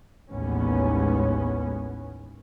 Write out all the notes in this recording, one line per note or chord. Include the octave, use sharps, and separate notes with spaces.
A1 D#2 G#3 B3 C#4